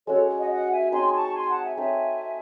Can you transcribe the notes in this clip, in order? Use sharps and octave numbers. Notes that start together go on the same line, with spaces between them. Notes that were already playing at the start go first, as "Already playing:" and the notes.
G#3 C#4 F#4 A4 C#5
D#5 F#5
D#5 F#5
E5 G#5
C4 D#4 G#4 C#5 G#5 C6
C6
A5 C#6
G#5 C6
F#5 A5
E5 G#5
C4 D#4 A4 C#5 E5 G#5